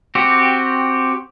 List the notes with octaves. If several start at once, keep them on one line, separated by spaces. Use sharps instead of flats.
C4 F#4 G4